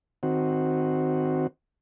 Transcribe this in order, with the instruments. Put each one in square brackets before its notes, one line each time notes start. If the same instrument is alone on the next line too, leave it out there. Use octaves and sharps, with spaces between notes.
[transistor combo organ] D#3 C4 F#4